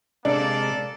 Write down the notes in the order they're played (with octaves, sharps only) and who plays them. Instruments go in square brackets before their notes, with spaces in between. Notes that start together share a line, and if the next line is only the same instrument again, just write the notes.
[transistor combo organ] C3 G#3 [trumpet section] A#3 A4 D5 [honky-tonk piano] D4